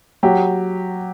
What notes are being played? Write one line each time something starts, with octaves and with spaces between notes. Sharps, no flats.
F#3 G4